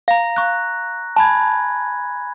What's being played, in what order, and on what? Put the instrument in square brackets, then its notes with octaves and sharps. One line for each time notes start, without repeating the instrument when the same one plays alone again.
[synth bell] F5 [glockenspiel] A#5 A#6
[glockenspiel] A#5 C#6 F#6
[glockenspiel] G#5 B5 G#6 [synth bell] A5